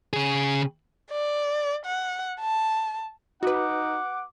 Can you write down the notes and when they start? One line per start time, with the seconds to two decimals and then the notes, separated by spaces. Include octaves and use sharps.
0.13 C#3 G#4
1.11 D5
1.86 F#5
2.40 A5
3.43 D#4 F#4 B4 F#5 D6